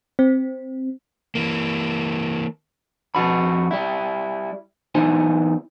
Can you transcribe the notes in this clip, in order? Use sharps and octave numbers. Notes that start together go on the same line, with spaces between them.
C4
E3 A#3
F2 F#4 B5
G3 E4
E2 D#4 E4 C5 G#5